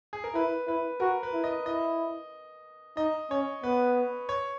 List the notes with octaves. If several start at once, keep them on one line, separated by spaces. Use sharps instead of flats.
G#4
A#4
E4 B4
E4 B4
F#4 A#4
B4
E4
D#5
E4 D#5
D#4 D#5
C#4 C#5
B3 B4
C#5